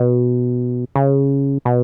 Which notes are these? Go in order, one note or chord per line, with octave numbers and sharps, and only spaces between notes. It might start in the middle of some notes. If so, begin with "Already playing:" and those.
Already playing: B2
C#3
B2